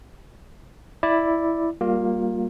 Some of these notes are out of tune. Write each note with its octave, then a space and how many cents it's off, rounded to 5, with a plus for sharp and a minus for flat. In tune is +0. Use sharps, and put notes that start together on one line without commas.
E4 +0 D5 +5
G3 +0 A#3 +0 F4 +30